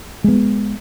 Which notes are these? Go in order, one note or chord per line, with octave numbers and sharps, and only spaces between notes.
G#3 B3